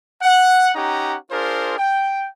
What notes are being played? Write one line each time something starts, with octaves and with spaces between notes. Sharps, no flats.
F#5
C#4 D#4 G4 F#5 A#5
D4 F4 G#4 A#4 C5
G5